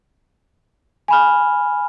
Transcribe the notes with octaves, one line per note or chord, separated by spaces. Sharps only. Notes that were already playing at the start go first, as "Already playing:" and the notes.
G#5 B5 F6